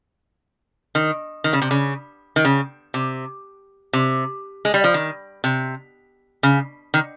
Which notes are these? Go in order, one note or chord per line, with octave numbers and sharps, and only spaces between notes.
D#3
D#3
C#3
C3
C#3
D#3
C#3
C3
C3
G#3
G3
F3
D#3
C3
C#3
D#3